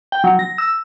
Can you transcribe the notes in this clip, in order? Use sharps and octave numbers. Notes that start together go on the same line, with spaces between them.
G5
F#3
A#6
E6